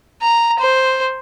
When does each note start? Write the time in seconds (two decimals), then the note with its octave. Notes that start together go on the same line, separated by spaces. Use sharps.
0.22 A#5
0.59 C5